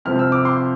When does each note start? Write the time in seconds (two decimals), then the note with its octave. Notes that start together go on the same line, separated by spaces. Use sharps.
0.05 F2 C3 F3 C4 F6
0.19 E6
0.32 D6
0.45 C6